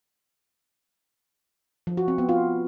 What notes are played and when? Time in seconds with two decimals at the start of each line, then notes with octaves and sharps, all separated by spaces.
1.87 F3
1.97 F#4
2.08 C4
2.18 B3
2.29 F4